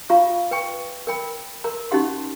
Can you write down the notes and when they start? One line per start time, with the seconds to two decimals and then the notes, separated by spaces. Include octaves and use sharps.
0.10 F4 F5 A#5 C#6
0.51 B4 G5 C#6
1.07 A#4 G5 B5
1.64 A#4 A#5
1.91 C#4 D#4 F#4 G4 F#5 C6